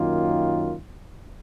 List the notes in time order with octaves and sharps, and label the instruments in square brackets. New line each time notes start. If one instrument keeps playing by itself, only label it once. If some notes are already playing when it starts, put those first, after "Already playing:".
Already playing: [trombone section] F#2 D#3 A#3 F4